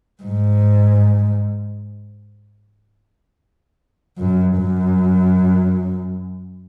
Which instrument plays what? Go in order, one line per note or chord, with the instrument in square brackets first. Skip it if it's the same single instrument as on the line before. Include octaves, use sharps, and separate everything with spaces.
[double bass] G#2
F#2
F#2